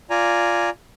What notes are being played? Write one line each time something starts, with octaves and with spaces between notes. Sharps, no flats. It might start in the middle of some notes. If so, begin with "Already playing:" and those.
F4 D5 G#5 A#5